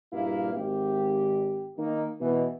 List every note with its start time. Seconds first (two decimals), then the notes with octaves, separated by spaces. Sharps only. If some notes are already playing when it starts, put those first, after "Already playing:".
0.13 A#1 G2 G3 A#3 E4 F5
0.54 G#1 G4
1.78 D#3 A#3 D#4
2.20 B2 E3